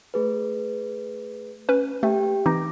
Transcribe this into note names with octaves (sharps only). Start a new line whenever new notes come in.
A3 G#4 B4
C#4 B4
A3 G4 G5
E3 C4 D#4 D6 A#6